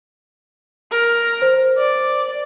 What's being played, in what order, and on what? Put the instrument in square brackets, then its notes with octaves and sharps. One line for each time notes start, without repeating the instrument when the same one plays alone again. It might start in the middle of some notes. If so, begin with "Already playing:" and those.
[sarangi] A#4
[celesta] C5
[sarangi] D5